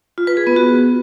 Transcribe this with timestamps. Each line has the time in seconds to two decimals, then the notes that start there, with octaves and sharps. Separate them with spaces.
0.18 F4
0.27 B4
0.37 G#4
0.47 B3
0.56 F#4